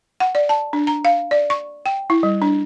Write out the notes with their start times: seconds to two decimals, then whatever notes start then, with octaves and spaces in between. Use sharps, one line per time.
0.20 F#5
0.35 D5
0.49 A5
0.73 D4
0.87 A#5
1.05 F5
1.31 D5
1.50 C#6
1.86 G5
2.10 E4
2.23 G3
2.42 D4